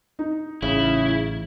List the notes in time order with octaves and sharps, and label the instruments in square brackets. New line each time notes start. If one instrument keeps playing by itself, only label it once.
[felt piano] D#4
[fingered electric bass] A1 [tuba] C#3 [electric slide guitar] E4